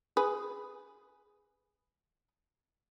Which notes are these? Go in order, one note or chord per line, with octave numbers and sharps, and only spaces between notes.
G#4 B4